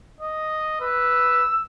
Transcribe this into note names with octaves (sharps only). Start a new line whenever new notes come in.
D#5
B4 E6